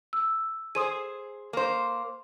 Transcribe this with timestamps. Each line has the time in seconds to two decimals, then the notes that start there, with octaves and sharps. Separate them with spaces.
0.13 E6
0.75 G#4 C5 D#6 D#7
1.53 A#3 C5